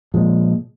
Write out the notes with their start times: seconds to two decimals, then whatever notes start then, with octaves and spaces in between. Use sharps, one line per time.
0.14 A#2 F3 G#3